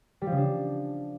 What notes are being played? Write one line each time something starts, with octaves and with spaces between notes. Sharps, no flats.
G3
F3
C#3
D4